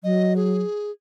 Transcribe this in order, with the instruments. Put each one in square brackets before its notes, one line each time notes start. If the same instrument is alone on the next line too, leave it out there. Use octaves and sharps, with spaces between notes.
[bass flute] F#3 [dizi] D#5
[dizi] G#4